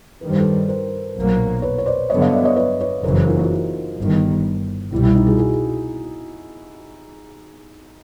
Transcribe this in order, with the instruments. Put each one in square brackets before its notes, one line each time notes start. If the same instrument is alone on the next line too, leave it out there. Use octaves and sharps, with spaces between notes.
[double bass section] G2 D#3 G3 [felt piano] B4
[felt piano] C5
A4 B4
A#4 C5
[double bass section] B1 A#2 F#3 A#3
[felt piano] B4 C#5
C#5
C5 D5
[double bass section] G2 D3 F#3 B3 [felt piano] C#5 D#5
[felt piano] D#5 F5
D5 E5
C#5 D#5
B4 C#5
B4 C#5
[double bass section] F#1 F#2 C#3 E3 [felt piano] A#4 C5
[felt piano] G#4 A#4
D#4 F4
E4 F#4
E4
[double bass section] G1 G2 D#3
[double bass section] C2 B2 G3 [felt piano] E4
[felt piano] E4
D#4
F#4 G#4
F#4 G#4